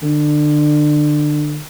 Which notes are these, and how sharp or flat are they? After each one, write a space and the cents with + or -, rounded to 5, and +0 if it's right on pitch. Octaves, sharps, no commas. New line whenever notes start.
D3 +25